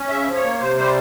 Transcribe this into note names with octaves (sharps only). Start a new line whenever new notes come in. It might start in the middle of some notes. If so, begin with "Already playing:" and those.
Already playing: C#4
C#3 E5
F3
C#5
A#3
C3 C5
G3 C5